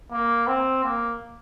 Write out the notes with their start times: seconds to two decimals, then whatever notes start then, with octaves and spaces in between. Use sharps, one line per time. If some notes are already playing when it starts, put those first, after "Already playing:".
0.12 A#3
0.47 C4
0.84 A#3